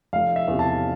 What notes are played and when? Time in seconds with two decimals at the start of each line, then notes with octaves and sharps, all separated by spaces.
0.13 F1 F5
0.36 E5
0.48 E2 C3
0.59 A5